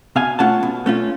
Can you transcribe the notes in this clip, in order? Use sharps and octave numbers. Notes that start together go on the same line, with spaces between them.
B2 F5 G#5
A3 C#4 F4 F#5 A5
B2
A3 C#4 F4